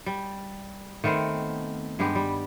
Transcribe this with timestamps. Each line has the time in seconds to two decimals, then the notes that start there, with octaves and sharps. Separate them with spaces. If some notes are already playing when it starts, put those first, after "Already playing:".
0.06 G3
1.04 D#3 A3 B3 C4
1.99 G2 G#3 B3 G4
2.15 G3